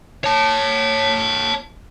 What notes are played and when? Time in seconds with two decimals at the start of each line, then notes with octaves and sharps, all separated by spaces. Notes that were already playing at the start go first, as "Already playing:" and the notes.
0.24 C#5 A5